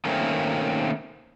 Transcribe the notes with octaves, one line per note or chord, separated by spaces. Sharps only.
D#3 A3 A#3 C4 C#4